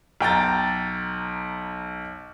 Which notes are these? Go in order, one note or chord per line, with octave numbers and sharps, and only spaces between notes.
B1 G5 A#5 A6